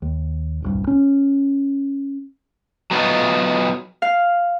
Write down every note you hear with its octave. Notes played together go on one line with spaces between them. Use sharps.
D#2
D#1 C2 G2
C#4
F#3 B3 C#4 D#4 F4
F5